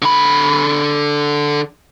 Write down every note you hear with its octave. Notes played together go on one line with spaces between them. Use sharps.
D3 B5